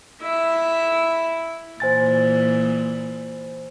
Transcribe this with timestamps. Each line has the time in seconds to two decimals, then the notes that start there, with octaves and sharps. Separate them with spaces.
0.22 E4 E5
1.80 A#2 E3 C5 G#5 A6